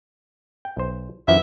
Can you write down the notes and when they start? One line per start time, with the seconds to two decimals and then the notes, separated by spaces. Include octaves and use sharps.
0.65 G5
0.77 B1 C5
1.28 F#2 E3 F3 E5